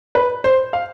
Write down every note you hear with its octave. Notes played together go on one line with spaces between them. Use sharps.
B4
C5
F5